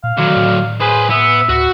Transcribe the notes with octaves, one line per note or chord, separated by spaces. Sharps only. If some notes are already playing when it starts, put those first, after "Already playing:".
A#2 F5
D3 D#3 F#3
A2
G#4 B4 C5
B3 E5
D2 F#4